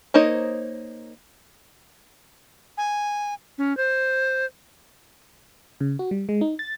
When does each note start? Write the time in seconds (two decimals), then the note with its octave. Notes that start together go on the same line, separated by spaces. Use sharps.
0.14 A#3 D#4 C5 C#5 D#5
2.78 G#5
3.58 C#4
3.77 C5
5.81 C#3
5.99 F#4
6.11 G3
6.29 G#3
6.41 D#4
6.59 A6